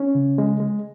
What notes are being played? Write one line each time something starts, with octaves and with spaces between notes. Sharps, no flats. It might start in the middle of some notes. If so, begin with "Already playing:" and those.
Already playing: C#4
C#3
G#3
G#3